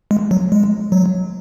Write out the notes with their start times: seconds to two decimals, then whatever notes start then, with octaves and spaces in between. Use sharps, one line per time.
0.11 G#3
0.31 F#3
0.52 G#3
0.92 F#3